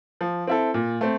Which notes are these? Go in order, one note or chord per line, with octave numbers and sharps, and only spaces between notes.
F3
C4 E4 A4
A#2
A3 C4